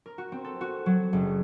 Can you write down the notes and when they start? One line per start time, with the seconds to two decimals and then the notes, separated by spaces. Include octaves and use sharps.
0.06 A#4
0.18 F#4
0.32 C4
0.45 A4
0.61 F#4
0.86 F#3
1.13 F#1